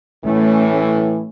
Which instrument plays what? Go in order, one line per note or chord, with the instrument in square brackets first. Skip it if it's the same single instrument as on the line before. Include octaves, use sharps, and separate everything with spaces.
[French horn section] A2 E3 [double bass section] A3 C#4